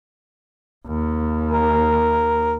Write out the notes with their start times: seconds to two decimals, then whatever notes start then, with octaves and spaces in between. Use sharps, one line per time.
0.87 D#2
1.52 A#4